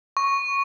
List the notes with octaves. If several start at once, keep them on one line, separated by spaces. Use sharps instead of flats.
C#6